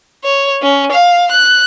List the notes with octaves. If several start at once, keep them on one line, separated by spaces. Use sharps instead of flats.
C#5
C#4
F5
F#6